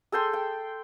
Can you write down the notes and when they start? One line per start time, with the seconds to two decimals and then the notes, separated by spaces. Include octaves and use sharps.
0.12 G#4 A4 G5 C6
0.33 G5